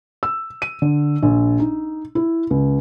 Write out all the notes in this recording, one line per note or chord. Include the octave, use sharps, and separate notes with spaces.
E6
D#7
D3
A#1
D#4
E4
C#2